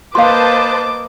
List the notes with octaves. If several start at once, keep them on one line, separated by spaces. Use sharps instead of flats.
A#3 B4 C5 D#5 F5 A5 C6 D6